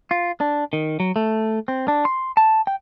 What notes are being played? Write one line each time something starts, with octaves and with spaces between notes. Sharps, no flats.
F4
D4
D#3
F#3
A3
C4
D4
C6
A5
G5